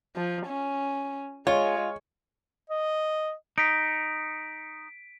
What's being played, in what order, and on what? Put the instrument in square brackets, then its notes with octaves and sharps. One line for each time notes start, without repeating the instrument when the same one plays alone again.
[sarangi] F3
C#4
[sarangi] G#3 [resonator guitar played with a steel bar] F4 [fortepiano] C#5
[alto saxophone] D#5
[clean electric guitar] D#4 [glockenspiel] B6 D7